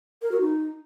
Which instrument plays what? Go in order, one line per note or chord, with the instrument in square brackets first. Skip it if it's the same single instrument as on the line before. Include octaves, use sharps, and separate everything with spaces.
[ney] A#4
F#4
D#4